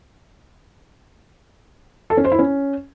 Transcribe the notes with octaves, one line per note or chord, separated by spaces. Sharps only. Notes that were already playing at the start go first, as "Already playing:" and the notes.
A4
C#4
C5
E4
C#4